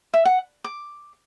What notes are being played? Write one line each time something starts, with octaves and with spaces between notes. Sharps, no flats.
E5
F#5
D6